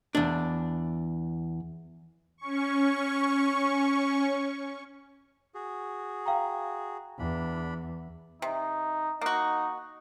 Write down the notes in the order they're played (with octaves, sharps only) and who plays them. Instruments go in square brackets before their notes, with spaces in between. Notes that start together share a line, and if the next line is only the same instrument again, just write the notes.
[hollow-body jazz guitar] E2 D4
[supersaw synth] C#4 C#6
[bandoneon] F#4 G#4
[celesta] F5 G5 A#5
[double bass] E2 [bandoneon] D4 B5
[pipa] C3 [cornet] D#4
[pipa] A#3 F#4 [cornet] D#4